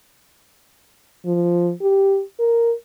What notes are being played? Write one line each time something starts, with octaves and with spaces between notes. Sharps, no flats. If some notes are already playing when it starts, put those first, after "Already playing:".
F3
G4
A#4